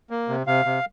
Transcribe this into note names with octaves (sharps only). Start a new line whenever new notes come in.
A#3
C3
C3 F5
C3